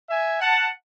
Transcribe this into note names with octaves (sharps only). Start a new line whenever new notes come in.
E5 G#5
F#5 A5